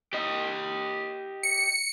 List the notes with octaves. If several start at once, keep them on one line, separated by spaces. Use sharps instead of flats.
G4 D#5
C#7